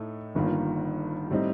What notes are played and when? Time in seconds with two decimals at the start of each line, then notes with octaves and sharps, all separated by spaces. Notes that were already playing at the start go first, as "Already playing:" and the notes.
Already playing: A2 A3 D#4
0.35 G1 G2 D#3 A#3 F4
1.31 A2 G3 C4 D#4